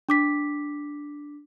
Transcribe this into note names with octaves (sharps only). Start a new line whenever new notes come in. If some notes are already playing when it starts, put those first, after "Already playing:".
D4 D6 B6